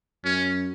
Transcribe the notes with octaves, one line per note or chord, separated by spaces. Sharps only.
F#2 C#4